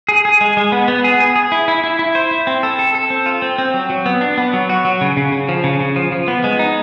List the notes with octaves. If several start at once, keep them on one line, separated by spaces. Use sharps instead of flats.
G#4
G#4
G#3
G#3
B3
B3
G#4
G#4
G#4
E4
E4
E4
E4
C5
E4
C4
A4
A4
A4
C4
F4
C4
C4
F#3
F#3
B3
D4
B3
F#3
F#4
F#3
C#3
C#3
C#3
F3
C#3
C#3
F3
F3
B3
G#3
D#4